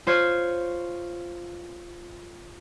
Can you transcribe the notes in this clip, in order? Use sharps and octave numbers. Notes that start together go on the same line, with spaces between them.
F4 C5 C#5